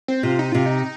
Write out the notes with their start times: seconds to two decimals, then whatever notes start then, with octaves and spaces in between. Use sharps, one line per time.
0.08 C4
0.23 C3 F4
0.39 D#4
0.52 C3 F4
0.66 D#4